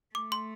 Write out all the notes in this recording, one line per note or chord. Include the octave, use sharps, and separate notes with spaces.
A3 D6
C6